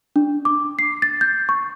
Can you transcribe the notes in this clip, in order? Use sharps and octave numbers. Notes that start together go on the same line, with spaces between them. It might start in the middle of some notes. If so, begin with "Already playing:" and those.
D4
D6
C7
A6
G6
C#6